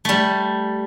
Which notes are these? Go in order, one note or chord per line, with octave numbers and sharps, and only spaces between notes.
G3 A3